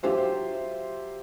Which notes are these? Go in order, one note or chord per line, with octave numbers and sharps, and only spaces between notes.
F#3 F4 G4 C5 E5